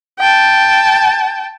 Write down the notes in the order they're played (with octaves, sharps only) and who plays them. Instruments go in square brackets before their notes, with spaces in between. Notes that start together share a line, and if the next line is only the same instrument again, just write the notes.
[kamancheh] G5 A5